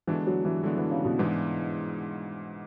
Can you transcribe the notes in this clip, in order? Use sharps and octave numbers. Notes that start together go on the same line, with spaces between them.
D3 E3 G#3 B3 D4 F#4
F#3
E3
D3 F#3 G#3 B3 D4 F#4
E3
C#3
B2
G#2 E3 G#3 B3 D4